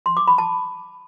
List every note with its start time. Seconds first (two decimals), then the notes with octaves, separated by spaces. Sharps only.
0.06 C6
0.17 D6
0.28 B5
0.38 A5